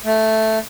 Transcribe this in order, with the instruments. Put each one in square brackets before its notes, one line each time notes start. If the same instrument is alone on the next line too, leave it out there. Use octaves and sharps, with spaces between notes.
[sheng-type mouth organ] A3